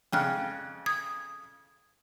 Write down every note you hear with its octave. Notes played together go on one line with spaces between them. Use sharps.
F2 C#3 G5 F6 F#6
D#6 G#6